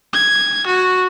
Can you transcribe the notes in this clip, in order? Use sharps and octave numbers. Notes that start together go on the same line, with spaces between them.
G#6
F#4